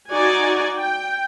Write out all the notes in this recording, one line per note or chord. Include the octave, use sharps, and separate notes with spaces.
D#4 F#4 D5 G#5
G5